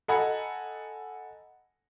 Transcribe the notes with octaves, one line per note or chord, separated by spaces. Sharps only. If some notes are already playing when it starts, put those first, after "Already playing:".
A4 D#5 F#5 G#5 A#5 B5